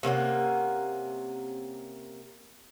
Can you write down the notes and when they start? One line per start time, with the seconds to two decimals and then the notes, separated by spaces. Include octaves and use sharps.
0.03 C3 A#3 C#4 F#5